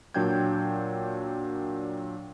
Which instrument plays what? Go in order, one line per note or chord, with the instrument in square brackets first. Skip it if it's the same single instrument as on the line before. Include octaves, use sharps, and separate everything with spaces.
[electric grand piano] A#2 F#3 D4 G5 G6 G#6